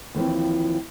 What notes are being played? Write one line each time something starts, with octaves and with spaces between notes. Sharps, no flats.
D#2 E3 F3 C4